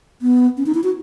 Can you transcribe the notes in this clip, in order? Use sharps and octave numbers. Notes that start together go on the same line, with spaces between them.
B3
C#4
D#4
E4
F#4